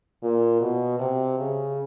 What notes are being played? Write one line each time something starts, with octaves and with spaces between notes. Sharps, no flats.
A#2
B2
C3
C#3